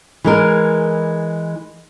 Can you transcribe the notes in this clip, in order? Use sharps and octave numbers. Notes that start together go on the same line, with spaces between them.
E3 G#3 A#4